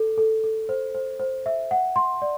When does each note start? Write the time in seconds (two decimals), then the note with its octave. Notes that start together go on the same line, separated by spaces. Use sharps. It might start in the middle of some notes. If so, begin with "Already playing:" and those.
Already playing: A4
0.18 A4
0.44 A4
0.69 C5
0.94 C5
1.20 C5
1.46 E5
1.71 F#5
1.96 C6
2.22 D5